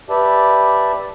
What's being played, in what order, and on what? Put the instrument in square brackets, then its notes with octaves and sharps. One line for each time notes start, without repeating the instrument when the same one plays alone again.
[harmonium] G4 B4 D5 E5 A5